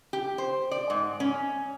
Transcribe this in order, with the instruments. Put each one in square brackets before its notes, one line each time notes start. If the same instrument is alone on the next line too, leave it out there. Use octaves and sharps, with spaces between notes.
[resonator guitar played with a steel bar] G4
C5
D5
G#2
C#4